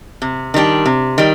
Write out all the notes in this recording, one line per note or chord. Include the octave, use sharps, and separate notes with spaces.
C3
D#3 G3 D4
C3
D#3 G3